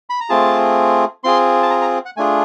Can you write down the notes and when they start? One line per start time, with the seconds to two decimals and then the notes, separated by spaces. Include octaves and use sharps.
0.10 B5
0.20 A#5
0.29 A3 C4 F4 G#4 A5
1.24 C4 F4 G#4 C6
1.63 A5
1.70 A#5
1.82 A#5
2.05 F#5
2.17 A3 D4 F4 G#4 G#5